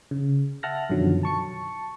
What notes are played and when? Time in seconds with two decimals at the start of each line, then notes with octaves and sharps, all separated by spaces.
0.11 C#3
0.63 E5 F#5 A5 F6 F#6 A#6
0.90 F#2 B2 D3 D#3 F3 F#3
1.23 A5 C#6 C#7